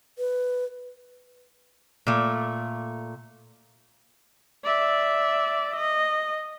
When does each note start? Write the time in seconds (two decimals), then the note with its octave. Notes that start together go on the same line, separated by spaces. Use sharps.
0.18 B4
2.07 A#2 A3
4.64 D5 E5
5.76 D#5